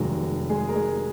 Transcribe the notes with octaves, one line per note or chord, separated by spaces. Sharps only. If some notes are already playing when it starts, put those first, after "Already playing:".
Already playing: F1 D#2 D#3 F#3 G#3 F#4
G#3 G#4
A#4
G#3 G#4